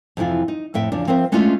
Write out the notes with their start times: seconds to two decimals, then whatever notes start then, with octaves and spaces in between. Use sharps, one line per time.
0.17 F2 C3 E3 E4 F4
0.48 D#4
0.74 F2 A2 E5 G5
0.92 E2 C#3 F3 D4
1.07 F3 C4 A#4 C5 D5 E5
1.32 G#3 A3 C#4 D4 E4 F4